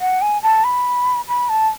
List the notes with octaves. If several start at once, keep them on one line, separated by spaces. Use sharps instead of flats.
F#5
G#5
A5
B5
B5
A5